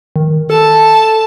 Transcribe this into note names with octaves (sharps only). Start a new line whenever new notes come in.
D#3
A4 A5